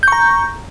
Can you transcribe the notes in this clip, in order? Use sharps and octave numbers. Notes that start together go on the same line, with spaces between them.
A#5 C#6 G6